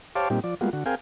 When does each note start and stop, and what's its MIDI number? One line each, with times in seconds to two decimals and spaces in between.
0.16 0.29 67
0.16 0.29 72
0.16 0.29 73
0.16 0.29 77
0.16 0.29 81
0.16 0.29 86
0.30 0.40 46
0.30 0.40 55
0.30 0.40 60
0.30 0.40 63
0.30 0.40 67
0.44 0.55 53
0.44 0.55 74
0.61 0.70 55
0.61 0.70 56
0.61 0.70 58
0.61 0.70 59
0.61 0.70 65
0.61 0.70 66
0.73 0.84 50
0.73 0.84 66
0.86 0.95 60
0.86 0.95 68
0.86 0.95 70
0.86 0.95 77
0.86 0.95 79
0.86 0.95 80